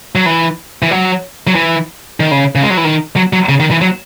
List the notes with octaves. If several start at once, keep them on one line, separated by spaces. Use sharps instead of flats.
F#3
E3
E3
F#3
F#3
E3
D#3
C#3
C#3
G#3
F#3
E3
D#3
F#3
F#3
C#3
D#3
E3
F#3